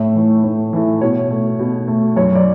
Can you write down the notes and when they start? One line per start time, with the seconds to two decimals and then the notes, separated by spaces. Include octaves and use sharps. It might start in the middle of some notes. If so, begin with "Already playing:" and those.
Already playing: A2 E5
0.15 E3 A3
0.44 A2
0.73 E3 A3
1.01 B2 C#5
1.31 A3
1.59 B2
1.88 A3
2.16 F#2 C#5
2.35 D5